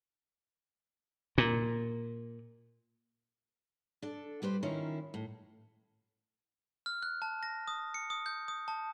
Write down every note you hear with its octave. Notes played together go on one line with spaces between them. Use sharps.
A#2
D4 A4
G3 G4 B4 C5
D#3 C#4 E4 F4 A#4
A2
F6
F#6
A5
A#6
D#6
C#7
D#6
G6
D#6
A5